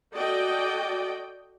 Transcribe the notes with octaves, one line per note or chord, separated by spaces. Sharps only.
F#4 A4 D5 D#5 G5